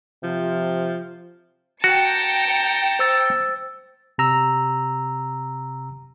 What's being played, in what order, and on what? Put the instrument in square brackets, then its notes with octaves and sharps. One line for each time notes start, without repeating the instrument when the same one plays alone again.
[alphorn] C3 [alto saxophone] F3
[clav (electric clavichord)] F#4 [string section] G5 C#7 [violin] A5 A#5
[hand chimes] C5 E6 A6
[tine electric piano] C3 A#5 E6